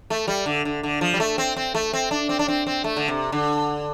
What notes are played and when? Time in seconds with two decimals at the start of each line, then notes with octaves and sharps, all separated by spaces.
0.10 A3
0.28 G3
0.46 D3
0.65 D3
0.83 D3
1.01 F3
1.14 G3
1.20 A3
1.38 C4
1.56 C4
1.75 A3
1.93 C4
2.11 D4
2.29 C4
2.39 D4
2.48 C4
2.67 C4
2.84 A3
2.96 D3
3.08 C3
3.32 D3